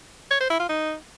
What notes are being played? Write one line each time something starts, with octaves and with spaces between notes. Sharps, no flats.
C#5
C5
E4
F4
D#4